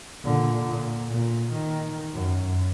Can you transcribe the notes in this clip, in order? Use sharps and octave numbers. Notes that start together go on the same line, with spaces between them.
A#2 D3
A#2
A#2
D#3
F#2